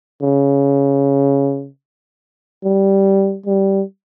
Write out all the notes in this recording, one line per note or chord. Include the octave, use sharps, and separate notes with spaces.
C#3
G3
G3